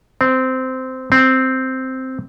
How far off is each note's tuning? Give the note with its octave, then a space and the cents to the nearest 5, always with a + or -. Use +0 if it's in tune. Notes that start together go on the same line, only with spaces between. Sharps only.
C4 -15
C4 -5